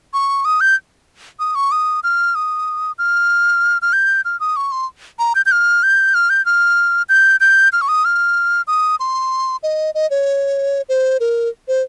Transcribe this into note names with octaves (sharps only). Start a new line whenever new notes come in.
C#6
D#6
G6
D#6
C#6
D#6
F6
D#6
F6
F6
G6
F6
D#6
C#6
C6
A#5
G6
G6
F6
G6
F6
G6
F6
G6
G6
F6
C#6
D#6
F6
D#6
C6
D#5
D#5
C#5
C5
A#4
C5